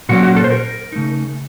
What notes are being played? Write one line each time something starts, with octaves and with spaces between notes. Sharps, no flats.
A#2 F#3 A#3 C#4 F#4
F#4
A4
C5
A#4
C#3 A3 D#4